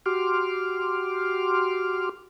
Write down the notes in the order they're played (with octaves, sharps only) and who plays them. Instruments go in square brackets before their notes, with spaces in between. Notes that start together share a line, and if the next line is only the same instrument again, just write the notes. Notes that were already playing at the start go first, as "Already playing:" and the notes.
[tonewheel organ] F#4 G4 C6 D6 F6